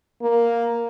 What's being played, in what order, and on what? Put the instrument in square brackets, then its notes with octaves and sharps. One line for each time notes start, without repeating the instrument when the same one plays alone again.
[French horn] A#3